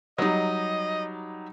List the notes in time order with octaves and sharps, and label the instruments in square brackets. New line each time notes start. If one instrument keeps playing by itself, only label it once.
[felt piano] F#3 G3 D#4 [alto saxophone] D#5